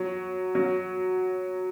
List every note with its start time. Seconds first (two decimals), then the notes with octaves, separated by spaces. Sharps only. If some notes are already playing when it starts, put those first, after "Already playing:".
Already playing: F#3
0.55 F#3